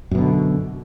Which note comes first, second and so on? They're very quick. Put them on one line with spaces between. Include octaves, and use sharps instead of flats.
F#2 B2 D3